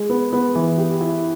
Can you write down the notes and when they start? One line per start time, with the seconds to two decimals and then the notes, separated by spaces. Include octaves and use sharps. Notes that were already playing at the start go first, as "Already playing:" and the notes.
Already playing: G#3
0.10 B3
0.33 B3
0.55 E3
0.78 G4
1.01 E4